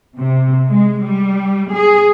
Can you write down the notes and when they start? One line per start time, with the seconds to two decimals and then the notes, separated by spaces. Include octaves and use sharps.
0.19 C3
0.69 G#3
1.05 G3
1.73 G#4